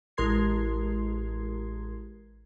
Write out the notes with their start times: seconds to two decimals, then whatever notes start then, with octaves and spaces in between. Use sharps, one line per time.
0.17 A1 G#3 A#4 C6 G#6 C7